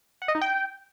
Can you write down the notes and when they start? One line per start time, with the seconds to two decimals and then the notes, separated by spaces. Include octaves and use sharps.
0.22 F#5
0.28 D#5
0.35 D#4
0.41 G5